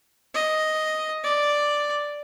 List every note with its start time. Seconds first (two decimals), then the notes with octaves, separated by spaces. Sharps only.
0.34 D#5
1.24 D5